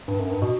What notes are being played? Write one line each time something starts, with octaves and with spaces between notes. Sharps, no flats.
G2
F#2
G2
B2